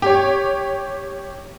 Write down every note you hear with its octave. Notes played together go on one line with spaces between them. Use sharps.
G4 C#5